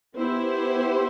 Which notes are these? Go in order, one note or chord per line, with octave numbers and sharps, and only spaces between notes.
B3 E4 G4 C5